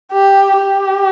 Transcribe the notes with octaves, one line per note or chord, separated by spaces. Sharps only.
G4
G4